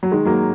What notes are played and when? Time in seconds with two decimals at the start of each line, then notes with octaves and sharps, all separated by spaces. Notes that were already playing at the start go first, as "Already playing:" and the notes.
0.03 F#3
0.11 D#3 G#3
0.25 F#3 A#3